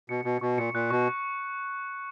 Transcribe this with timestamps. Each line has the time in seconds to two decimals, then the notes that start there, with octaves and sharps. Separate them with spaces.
0.09 B2 C#7
0.25 B2 C#7
0.41 B2 C#6
0.57 A#2 C#7
0.74 A#2 F#6
0.90 B2 C#6